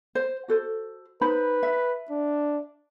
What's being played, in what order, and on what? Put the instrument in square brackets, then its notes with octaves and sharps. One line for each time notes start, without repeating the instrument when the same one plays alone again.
[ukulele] C5
F#4 A4 C5
[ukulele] D#4 C5 B5 [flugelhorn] B4
[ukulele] E5
[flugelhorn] D4